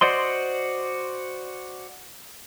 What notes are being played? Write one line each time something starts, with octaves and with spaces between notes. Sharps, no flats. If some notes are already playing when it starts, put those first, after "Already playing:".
F#4 C5 D5 D#5 C6